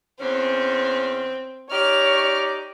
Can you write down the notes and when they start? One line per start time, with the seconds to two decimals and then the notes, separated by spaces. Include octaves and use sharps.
0.20 E2 C4 C#4
1.71 D#4 G4 C#5 D5 F6